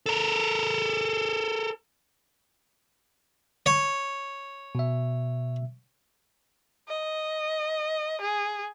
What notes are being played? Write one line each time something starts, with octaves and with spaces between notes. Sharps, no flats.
A4 A#4
C#5
B2 E5
D#5
G#4